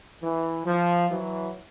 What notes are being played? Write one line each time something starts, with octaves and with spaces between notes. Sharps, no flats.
E3
F3
E3 F#3